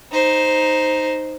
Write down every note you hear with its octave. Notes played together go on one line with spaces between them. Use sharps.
D#4 C5